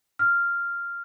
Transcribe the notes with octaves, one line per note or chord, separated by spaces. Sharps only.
F6